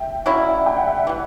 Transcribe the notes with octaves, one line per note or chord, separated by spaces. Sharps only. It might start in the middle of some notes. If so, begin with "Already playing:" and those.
Already playing: E5 G5
C#3 F#3 C#4 E4
D5
E5
F#5
G5
F#5
E5
F#5
E3 G3